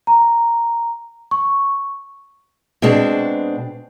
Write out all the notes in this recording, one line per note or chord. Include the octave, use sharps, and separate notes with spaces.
A#5
C#6
B2 G#3 C4 D4